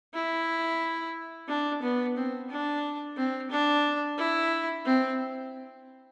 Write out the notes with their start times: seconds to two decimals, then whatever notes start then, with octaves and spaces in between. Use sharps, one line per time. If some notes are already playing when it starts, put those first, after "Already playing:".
0.14 E4
1.48 D4
1.82 B3
2.17 C4
2.50 D4
3.17 C4
3.51 D4
4.18 E4
4.85 C4